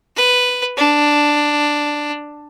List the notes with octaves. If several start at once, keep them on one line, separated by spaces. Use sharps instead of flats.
B4
D4